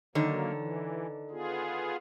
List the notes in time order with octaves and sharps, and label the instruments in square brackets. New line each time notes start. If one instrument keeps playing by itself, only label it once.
[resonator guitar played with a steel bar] D3 D#3 C#5 [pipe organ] F#3 A#3
[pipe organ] E3
B3 F4 G#4